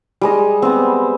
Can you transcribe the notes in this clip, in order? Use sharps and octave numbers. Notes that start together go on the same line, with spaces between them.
G3 G#3 D#5
B3 C4